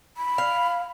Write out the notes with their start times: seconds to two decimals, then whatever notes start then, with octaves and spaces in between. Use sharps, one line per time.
0.17 B5
0.38 F5